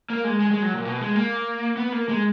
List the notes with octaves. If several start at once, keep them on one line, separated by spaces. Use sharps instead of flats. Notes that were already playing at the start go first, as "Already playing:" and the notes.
A#3
G#3
G#3
G#3
F#3
A#2
B2
G#3
A#3
B3
A#3
G#3